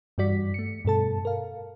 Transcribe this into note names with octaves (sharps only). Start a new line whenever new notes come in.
G2 E3 G3 F#4 D5 B6
A3 C#7
G2 B2 A4 A5
A#4 F5